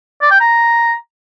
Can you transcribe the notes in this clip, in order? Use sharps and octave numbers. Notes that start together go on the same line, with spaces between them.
D5
G5
A#5